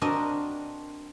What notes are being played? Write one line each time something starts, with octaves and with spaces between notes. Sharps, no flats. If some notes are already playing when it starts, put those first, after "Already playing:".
C4 D4 F#4 A#4 D#5